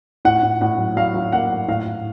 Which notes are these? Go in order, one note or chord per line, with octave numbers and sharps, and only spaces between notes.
A2 F#5
A2
A2 F#5
F#3
F#3 F5
F#3
A#3 F#5
A2
A2 F5
A2